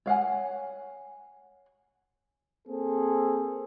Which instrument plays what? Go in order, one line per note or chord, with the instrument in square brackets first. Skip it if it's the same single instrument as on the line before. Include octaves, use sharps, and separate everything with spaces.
[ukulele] C#5 F5 F#5 G#5
[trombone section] A#3 C4 G#4 A4